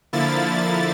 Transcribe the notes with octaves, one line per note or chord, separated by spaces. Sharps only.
D3 F3 A#3 E4 A6
A6